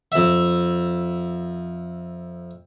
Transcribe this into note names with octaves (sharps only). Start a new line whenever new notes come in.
F2 E5